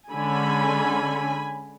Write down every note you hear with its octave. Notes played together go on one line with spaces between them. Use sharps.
D3 G#3 C#4 G#5 B5